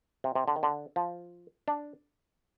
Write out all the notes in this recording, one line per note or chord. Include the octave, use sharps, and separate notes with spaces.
C3
C3
D3
D#3
D3
F3
D4